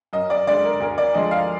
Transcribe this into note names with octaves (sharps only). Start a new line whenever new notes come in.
F#2 D#5
D5
D3 G#3 D5
A#4
D2 A#4
D5
D3 F3 G#3 D#5
F5